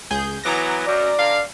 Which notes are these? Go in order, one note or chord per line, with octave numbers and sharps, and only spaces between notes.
C#2 G#4 G6
E3 F#3 B3 A#5 D6 A#6
F#2 D5
D3 F5